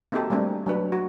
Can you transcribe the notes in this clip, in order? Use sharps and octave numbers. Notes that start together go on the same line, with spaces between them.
A#3 C4 D#4 F#4 G4 A4
G3 A3 A#3 C4 D4
F#3 D4 B4
F#4